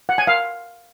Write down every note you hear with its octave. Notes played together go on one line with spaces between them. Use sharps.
F#5
G#5
F5